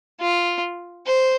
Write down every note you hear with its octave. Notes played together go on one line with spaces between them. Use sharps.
F4
C5